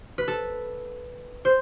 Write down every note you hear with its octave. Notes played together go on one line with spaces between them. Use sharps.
B4
A4
C5